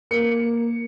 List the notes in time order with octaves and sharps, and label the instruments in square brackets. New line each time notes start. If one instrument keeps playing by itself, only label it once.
[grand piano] A#3 C#7